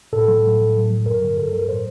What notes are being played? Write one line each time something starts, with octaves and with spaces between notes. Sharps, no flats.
A2 A4
F#3
A2
F#3
A2
F#3
G2 A#4
D3 F#3
G2 A4
F#3 A#4
A2 C5